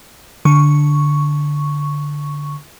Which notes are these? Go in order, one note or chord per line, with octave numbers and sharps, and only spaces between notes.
D3 C#6